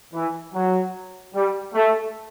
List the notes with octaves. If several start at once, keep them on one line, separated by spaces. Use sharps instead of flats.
E3
F#3
G3
A3